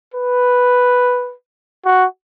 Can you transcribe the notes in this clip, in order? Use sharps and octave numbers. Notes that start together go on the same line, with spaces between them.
B4
F#4